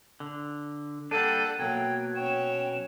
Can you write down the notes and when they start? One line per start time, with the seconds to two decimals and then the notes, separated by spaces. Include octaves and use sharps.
0.20 D3
1.11 G3 A#3 D4 A4 F#5 A5 D#7
1.59 B2 F#3 A#3 G5 G#6
2.15 C#4 C#5 G5 E7